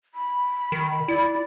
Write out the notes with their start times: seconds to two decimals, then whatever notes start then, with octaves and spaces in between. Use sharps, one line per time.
0.15 B5
0.72 D#3
1.08 E4 D5